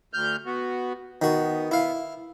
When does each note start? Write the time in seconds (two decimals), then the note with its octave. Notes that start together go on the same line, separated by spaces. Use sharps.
0.13 D2 F6 G6
0.46 B3 F#4
1.22 D#3 B3 F#4
1.71 E4 F5